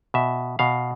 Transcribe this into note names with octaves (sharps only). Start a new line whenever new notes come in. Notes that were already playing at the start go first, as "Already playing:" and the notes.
B2 E5
B2 F5